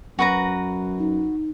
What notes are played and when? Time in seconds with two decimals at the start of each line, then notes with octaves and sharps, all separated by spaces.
0.19 F#2 F#4 B4 A#5
0.99 D#4